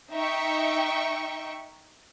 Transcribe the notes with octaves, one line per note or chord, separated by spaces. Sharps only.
D#4 E5 G5 C#6